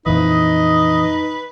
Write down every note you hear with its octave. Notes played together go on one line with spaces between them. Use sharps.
F2 A#2 E3 D#4 B4 D#5